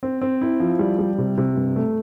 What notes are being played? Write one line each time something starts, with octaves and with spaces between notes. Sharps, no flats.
C4
C4
E4
F3
G3
G3
C3
C3
G2
A3